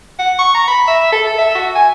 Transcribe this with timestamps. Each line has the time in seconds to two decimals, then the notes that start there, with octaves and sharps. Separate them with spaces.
0.19 F#5
0.39 C#6
0.54 A#5
0.68 B5
0.88 E5
1.12 A4
1.27 A4
1.39 E5
1.55 F#4
1.75 G#5